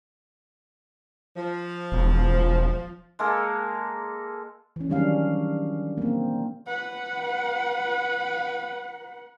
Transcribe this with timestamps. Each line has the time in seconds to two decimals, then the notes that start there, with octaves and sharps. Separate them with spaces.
1.36 F3
1.92 E1
3.19 G#3 A#3 A4 A#4
4.76 E3 C#4
4.90 D#3 F#3 G3 C#4 D4 F5
5.98 A#3 C4
6.66 B4 F#5